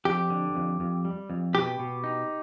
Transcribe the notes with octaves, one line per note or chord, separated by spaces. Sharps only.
F2 G4
D3
F2
F2
G3
F2
B2 G4
B2
D#4